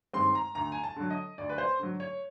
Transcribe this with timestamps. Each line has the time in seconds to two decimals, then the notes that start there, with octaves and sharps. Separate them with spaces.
0.13 G2 D#3 G#3 C4 C6
0.35 A#5
0.55 D2 A#5
0.72 G#5
0.84 A5
0.96 D3 F#3
1.10 D#5
1.38 D2 D5
1.49 B4
1.58 C5
1.79 D3 F#3
2.00 C#5